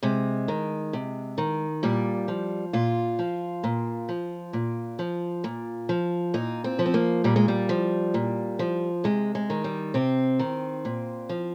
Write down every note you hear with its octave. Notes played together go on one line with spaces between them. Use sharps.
C3 G#3
D#3
C3
D#3
A#2 G3
F3
A#2 F4
F3
A#2
F3
A#2
F3
A#2
F3
A#2 D#4
C4
F3
C4
A#3
A#2 G3
G#3
G3
F3
A#2
F3
C3 G#3
G#3
D#3
G3
C3 C4
D#3
A#2
F3